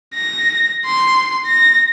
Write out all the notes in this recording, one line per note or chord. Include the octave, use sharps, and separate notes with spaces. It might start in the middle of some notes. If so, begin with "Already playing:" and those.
A#6
C6
A#6